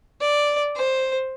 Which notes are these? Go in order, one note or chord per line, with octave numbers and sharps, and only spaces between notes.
D5
C5